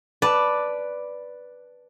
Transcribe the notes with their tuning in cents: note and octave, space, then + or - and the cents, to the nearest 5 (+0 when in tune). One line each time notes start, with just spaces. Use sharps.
B4 +0 D5 +0 A5 +0